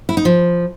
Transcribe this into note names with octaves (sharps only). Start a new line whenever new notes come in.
E4
D#4
F3